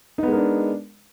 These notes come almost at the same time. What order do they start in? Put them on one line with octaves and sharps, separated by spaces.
D#4 B3 G#3 A#4 D4